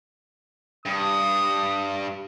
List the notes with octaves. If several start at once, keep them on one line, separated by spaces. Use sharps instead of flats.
G2 D#6